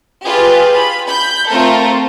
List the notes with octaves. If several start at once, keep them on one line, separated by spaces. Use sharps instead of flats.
F4 G4 G#4 B4
B5
B5 G6
A3 C4 F4 A4 A#4